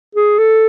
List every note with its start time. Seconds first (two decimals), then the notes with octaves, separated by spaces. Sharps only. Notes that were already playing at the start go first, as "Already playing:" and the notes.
0.15 G#4
0.39 A4